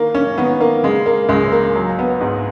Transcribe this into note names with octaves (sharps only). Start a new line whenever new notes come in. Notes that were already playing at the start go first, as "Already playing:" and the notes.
Already playing: D#3 A#3
C#4
D#3 B3
A#3
C#3 G#3
A#3
C#2 G#3
A#3
F#3
B3
G#2 D#4